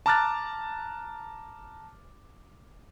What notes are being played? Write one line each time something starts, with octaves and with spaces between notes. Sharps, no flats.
A5 A#5 D6 F6 F#6 A6